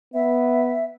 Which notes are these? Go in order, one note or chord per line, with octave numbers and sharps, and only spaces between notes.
B3 E5